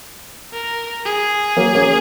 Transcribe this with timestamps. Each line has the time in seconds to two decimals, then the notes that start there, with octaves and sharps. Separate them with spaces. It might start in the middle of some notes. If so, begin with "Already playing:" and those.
0.53 A#4
1.05 G#4
1.57 F#3 A#3
1.74 A#3 C#4